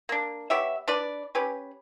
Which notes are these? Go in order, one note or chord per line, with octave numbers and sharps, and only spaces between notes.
A#3 D4
B3 G4 C#5 E5
D4 B4 D5
C#4 G4 B4